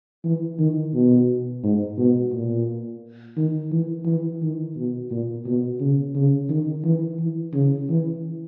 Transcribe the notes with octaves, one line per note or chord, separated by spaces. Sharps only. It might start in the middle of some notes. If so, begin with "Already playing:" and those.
E3
D#3
B2
G#2
B2
A#2
D#3
E3
E3
D#3
B2
A#2
B2
C#3
C#3
D#3
E3
E3
C#3
E3